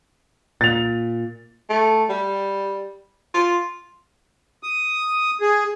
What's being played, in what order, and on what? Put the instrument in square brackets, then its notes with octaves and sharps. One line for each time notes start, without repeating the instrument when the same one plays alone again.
[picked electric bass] A#2 [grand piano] A6 F7
[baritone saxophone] A3
G3
F4
[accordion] D#6
G#4